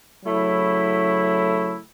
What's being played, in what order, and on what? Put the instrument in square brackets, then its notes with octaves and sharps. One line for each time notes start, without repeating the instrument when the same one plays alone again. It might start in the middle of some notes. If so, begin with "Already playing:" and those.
[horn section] C#3 F#3 A3 E4